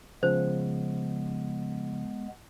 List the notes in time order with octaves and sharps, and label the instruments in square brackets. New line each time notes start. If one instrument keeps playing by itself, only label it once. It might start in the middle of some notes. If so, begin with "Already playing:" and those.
[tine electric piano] C#3 F3 [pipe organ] G#3 B3 [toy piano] C5